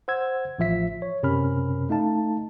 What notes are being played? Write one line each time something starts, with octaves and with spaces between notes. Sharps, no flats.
C5 F#5 E6 G#6
A1 F3 F4 E5 B6
C#5
F#2 C3 C#4 A#4 B5 F6
A3 D#4 F5 A5